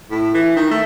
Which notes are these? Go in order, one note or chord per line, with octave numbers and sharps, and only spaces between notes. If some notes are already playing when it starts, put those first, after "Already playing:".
A2
E3
D#3
A3